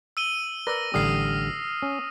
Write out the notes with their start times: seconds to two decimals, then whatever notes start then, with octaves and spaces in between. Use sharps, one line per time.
0.17 E6 D#7 G7
0.67 A#4 B4 D5 E6 A#6
0.94 A1 D3 G3 D#6 F6 C7
1.82 C#4